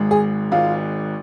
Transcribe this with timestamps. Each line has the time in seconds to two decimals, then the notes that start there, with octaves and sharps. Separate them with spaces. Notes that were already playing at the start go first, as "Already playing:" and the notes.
Already playing: G#1 G#2 G#3
0.11 G#4
0.51 G#1 G#2 G#3 F4 F5